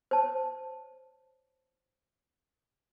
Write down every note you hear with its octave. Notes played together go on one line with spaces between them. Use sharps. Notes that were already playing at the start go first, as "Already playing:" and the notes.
C5 C#5 A5